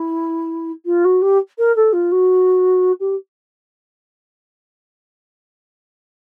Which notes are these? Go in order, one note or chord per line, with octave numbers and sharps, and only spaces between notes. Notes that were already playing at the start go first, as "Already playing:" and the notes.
Already playing: E4
F4
F#4
G4
A#4
A4
F4
F#4
G4